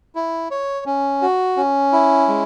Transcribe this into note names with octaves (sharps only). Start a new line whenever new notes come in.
E4
C#5
C#4
F#4
C#4
E4
G#3